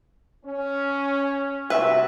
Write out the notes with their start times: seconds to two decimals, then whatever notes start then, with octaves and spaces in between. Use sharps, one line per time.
0.46 C#4
1.70 G2 C3 F#4 B4 E5